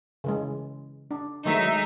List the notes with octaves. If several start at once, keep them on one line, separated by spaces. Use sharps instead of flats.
C#3 E3 G#3
D4
D#3 F#3 G#3 A3 D#4 E5